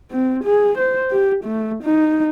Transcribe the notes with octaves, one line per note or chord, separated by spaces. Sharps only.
C4
G#4
C5
G4
A3
D#4